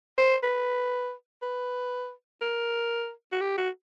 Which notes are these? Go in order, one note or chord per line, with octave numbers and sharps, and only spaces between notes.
C5
B4
B4
A#4
F#4
G4
F#4